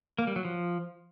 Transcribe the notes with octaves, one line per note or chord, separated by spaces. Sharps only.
A#3
G3
F#3
F3